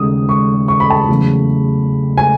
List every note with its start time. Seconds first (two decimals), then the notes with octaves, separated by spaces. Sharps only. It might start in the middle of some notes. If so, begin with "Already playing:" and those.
Already playing: D#2 C#3 G#3 D#6
0.29 C#6
0.68 C#6
0.80 B5
0.90 A5
1.02 B5
1.09 E2 C#3 F#3 A3
2.17 G#5